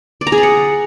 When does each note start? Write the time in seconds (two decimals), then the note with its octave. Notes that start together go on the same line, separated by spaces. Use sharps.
0.21 D5
0.27 A#5
0.32 G#4
0.38 D5
0.43 F#5